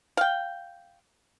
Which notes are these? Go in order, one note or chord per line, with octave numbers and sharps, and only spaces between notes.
F5 G5